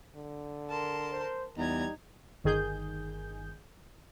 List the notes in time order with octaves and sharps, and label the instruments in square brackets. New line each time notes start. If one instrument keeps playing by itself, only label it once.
[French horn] D3
[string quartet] A#4 A5 C6
[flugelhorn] C5
[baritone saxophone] E2 [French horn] G3 [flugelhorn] D#4 [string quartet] A#5 G#6
[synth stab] G1 D#3 G#4 G6